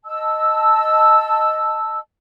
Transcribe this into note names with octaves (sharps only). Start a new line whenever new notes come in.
D#5 A5 E6